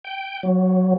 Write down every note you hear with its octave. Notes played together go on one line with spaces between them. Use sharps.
G5
F#3